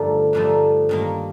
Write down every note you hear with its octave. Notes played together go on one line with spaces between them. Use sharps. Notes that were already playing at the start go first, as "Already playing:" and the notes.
Already playing: G2 D3 F3 A3 D#4
G2 D3 F3 A3 D#4
G2 D#3 A#3